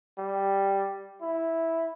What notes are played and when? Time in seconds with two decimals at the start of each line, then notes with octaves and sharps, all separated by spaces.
0.18 G3
1.21 E4